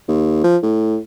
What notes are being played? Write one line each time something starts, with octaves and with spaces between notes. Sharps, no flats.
D#2
F3
A2